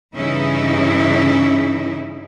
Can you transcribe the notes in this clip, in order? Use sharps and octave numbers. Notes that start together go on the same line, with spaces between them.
G2 C#3 E3 C#4 D#4 E4